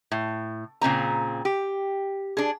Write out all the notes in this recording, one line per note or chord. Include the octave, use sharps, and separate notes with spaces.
A2
A#2 C#3 C4 A#5
G4
D4 G#4